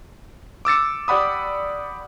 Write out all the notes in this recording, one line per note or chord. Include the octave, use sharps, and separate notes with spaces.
D6 E6 A6 C#7
G4 D5 F#5 B5 D#6